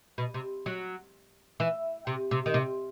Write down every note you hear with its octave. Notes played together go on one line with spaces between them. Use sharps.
B2
C3
F#3
E3
C3
C3
D#3
C3